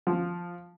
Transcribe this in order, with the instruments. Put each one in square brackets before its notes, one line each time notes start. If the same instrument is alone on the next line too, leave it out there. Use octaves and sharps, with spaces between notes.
[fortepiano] F3